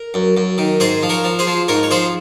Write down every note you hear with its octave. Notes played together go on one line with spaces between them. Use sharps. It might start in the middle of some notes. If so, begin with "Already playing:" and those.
Already playing: A#4
F#2
F#2
D#3
G#2 G#4 C5
F3
A#4 C#5
F3
G#4 C5
F3
G#2 A#4 C#5
C#5
F3 G#4 C5